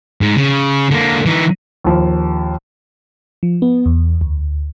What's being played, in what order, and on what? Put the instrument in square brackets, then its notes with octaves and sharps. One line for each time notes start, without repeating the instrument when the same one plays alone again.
[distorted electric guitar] G#2
C#3
D3 A#3
E3 D#4
[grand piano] D#2 F3
[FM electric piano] F3
B3
E2
D2